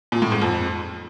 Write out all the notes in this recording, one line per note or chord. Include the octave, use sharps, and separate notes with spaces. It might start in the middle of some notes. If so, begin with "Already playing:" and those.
A#2
A2
G#2
F2